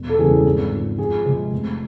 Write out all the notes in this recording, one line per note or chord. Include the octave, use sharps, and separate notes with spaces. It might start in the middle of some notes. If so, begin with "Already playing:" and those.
Already playing: E1
A4
E2 C#3 E3 G3 G#4
G#1
G#2 F3
F2 G#4
C3 F3 G#3
F1